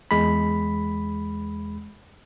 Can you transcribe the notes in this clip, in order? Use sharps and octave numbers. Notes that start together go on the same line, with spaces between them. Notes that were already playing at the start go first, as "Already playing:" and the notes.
E2 G#3 B5